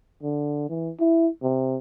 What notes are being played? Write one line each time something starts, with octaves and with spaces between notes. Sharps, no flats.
D3
E3
E4
C3